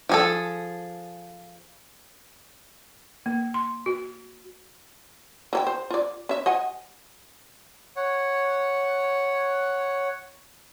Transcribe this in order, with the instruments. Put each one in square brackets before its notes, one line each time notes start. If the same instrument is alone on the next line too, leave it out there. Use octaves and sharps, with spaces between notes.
[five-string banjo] F3 G#4 A4
[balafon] A#3
C6
F#4
[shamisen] E3 A4 G5
C5
F4 D5
C#4 E5
D#5 F#5 G#5
[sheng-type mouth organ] C#5 F#5